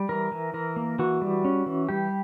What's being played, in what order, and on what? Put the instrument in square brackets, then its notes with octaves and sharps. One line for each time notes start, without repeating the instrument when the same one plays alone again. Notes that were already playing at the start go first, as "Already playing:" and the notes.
Already playing: [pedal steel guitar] G3
E3 A#4
E3
E3 A#4
A#3
E3 F#4
G3
C#4
E3
G3 G4